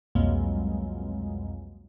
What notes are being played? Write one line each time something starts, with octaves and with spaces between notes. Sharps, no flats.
C2 F2 B2 F#3 G#3 A#3